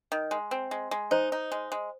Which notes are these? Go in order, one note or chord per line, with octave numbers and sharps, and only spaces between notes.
D#3
G#3
C4
G#3
G#3
D#4 C5
D#4
G#3
G#3